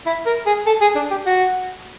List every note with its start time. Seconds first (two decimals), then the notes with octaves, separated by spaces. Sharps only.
0.06 E4
0.26 A#4
0.46 G#4
0.66 A4
0.81 G#4
0.96 D4
1.11 G4
1.26 F#4